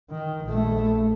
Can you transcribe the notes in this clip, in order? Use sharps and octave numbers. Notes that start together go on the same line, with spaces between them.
D#3
A#1 A3